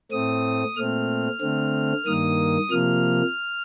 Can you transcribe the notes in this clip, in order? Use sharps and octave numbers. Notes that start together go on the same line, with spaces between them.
A2 A3 C4 D#6
A#2 A3 C4 F6
D3 A3 C4
G2 D#3 A#3 D#6
C3 F3 A#3 F6